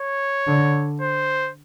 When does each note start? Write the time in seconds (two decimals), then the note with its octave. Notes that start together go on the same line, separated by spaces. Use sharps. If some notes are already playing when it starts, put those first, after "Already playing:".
Already playing: C#5
0.47 D3
1.01 C5